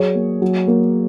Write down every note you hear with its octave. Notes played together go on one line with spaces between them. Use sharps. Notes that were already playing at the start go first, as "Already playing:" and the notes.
Already playing: F#3 G#4 C#5
A#3
F#3
A#3